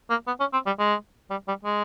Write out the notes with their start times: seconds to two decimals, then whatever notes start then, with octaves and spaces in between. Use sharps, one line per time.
0.10 A#3
0.27 B3
0.40 C#4
0.53 C4
0.66 G3
0.79 G#3
1.30 G3
1.48 G3
1.64 G#3